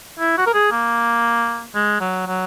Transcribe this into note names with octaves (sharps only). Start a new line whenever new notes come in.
E4
F#4
A#4
G#4
A#3
G#3
F#3
F#3